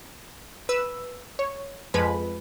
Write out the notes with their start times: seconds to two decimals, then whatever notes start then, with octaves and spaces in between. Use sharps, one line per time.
0.69 B4 E6
1.39 C#5
1.94 F2 F3 G#3 B4 B5